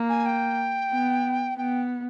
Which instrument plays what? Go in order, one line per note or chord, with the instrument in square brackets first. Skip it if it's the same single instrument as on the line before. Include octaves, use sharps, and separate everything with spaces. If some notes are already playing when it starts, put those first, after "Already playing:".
Already playing: [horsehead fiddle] A#3
[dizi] G#5
G5
[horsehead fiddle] B3
[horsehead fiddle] B3 [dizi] G5